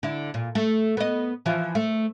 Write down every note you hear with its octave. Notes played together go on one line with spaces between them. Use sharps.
D3 E4
A#2
A3
B3 D#5
E3 F3 F4
A3